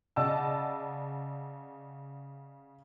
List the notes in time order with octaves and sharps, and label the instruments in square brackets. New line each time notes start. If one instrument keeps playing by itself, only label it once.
[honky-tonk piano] C#3 D5 D#5 F#5 A5 E6